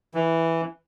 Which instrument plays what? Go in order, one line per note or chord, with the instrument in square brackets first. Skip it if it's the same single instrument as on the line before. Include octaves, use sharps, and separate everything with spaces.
[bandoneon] E3